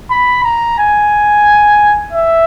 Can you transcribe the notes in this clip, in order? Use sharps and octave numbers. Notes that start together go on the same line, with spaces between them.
B5
A#5
G#5
E5